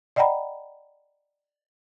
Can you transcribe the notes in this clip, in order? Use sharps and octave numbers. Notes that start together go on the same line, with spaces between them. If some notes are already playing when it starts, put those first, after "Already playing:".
D5 D#5 F#5 G5 A#5 B5